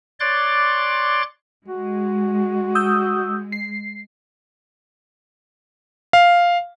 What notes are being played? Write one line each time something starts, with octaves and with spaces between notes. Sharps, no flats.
C#5 D5 C6 D6 F#6 A6
G#3 F#4
D#6 E6 G6
C7
F5